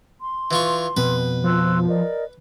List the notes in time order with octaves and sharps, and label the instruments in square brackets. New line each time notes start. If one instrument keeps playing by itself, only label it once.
[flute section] C6
[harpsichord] E3 F4 C#6
[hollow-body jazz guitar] F2 B2 [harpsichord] B4
[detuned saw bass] F3 [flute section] C6 E6 F#6
[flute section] A#4 D5 D#5